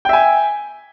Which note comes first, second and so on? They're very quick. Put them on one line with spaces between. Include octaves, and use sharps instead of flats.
G5 E5 G#5